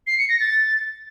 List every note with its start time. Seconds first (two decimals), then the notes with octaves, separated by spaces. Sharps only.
0.07 C7
0.18 C#7
0.29 A#6
0.40 A6